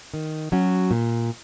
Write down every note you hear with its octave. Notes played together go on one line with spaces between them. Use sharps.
D#3
F#3 C#4 F#4
A#2